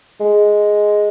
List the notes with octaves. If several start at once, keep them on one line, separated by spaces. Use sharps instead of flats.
G#3